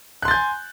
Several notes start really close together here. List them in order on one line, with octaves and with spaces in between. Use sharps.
F#6 C6 A6 G6 G#5